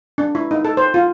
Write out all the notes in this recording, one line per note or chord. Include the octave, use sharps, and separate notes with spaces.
D4
E4
D#4
A4
C5
F4